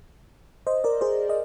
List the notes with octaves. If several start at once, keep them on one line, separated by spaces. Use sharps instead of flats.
C5 D#5
A#4 D5
G#4 C5
D#5